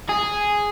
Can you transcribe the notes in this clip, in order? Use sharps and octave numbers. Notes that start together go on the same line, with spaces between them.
G#4